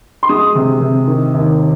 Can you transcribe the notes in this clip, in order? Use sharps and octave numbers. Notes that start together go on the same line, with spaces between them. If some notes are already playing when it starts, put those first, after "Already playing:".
C6
G#3 D#6
C3
C3
D#3
D#2